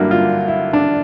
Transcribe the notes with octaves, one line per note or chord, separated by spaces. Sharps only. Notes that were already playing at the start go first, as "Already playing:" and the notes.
Already playing: G2 D3 F#3 A#3 E4
F4
E4
D4